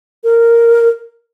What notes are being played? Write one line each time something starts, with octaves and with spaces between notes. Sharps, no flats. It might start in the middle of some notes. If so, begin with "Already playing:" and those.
A#4